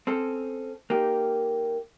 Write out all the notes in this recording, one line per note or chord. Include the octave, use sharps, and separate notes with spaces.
C4 C#4 A4
A#3 D#4 G4